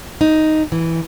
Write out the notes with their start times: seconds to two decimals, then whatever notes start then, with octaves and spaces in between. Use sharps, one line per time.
0.21 D#4
0.72 E3